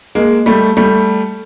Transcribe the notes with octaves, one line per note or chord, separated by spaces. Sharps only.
G#3 A#3
G3 A3
G3 A3